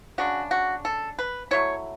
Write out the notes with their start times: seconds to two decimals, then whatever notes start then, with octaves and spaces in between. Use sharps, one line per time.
0.18 C#3 G#3 D4 F#4
0.51 F#4
0.85 A4
1.19 B4
1.51 F#3 A3 E4 C#5